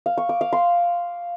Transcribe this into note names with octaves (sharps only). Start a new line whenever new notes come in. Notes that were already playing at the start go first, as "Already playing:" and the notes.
F5
C#6
D6
F5
C6